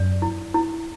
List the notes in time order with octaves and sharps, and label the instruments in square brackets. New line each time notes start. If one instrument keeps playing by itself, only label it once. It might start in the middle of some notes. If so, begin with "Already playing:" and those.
Already playing: [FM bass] F#2 [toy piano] D5
[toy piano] E4
E4